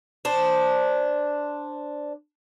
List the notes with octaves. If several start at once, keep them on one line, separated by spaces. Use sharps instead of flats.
D4 C5